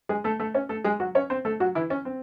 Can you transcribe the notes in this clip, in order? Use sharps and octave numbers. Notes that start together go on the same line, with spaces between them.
G#3 G#4
A3 A4
A3 A4
C#4 C#5
A3 A4
G#3 G#4
F#3 F#4
C#4 C#5
C4 C5
A3 A4
F#3 F#4
E3 E4
C#4
C4